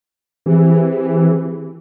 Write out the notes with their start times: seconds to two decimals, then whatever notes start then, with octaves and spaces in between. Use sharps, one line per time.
0.46 E3 C4 G4 G#4